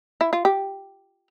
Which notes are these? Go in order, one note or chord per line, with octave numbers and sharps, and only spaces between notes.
E4
F4
G4